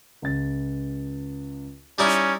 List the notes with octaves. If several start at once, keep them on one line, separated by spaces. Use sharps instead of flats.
C#2 A6
G3 C#4 D#4 E4